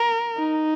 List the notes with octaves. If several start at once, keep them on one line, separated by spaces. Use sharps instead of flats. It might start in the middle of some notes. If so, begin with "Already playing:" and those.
Already playing: A#4
D#4